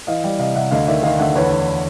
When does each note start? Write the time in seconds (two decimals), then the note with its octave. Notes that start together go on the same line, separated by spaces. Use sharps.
0.07 E3 D#5 F5
0.24 G3
0.39 C3 D#5 F5
0.55 C3 E5 F#5
0.71 D2 D#5 F5
0.87 D#3 D5 E5
1.03 D#3 D#5 F5
1.19 D2 E5 F#5
1.35 E2 B4 C#5
1.51 E2